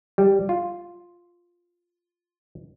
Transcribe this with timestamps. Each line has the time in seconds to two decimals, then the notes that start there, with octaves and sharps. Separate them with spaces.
0.18 G3
0.49 F4